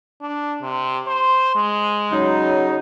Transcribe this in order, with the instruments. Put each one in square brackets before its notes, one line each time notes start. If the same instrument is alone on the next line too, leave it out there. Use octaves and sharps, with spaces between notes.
[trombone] D4
C3
C5
G#3
[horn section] C#3 F#3 D#4